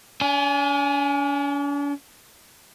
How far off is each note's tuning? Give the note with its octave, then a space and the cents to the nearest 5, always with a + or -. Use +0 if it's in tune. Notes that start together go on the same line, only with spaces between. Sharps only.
D4 -45 G#5 +5